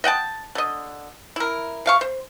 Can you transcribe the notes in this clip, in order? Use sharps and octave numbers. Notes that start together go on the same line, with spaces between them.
D#5 F#5 G5 A5
D3 D#5
E4 A#4
B2 F5 C#6
C5